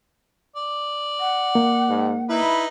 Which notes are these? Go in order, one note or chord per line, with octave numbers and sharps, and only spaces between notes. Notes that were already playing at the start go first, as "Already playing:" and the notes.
D5
F#5
A#3
G#2
D#4 E4 B4